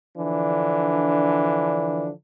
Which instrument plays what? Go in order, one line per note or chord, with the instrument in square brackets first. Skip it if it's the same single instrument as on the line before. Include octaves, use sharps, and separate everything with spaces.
[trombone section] D3 E3 F3 D4